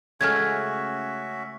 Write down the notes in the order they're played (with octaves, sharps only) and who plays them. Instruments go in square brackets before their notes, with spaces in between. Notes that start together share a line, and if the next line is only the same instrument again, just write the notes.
[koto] C#3 G#3 A3 [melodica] C#4 F#4 E5 [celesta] F6 G#6